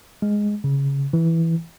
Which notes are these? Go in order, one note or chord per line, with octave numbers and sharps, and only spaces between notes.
G#3
C#3
E3